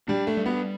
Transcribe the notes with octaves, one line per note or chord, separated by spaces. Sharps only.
G3 D4
A3
G3
B3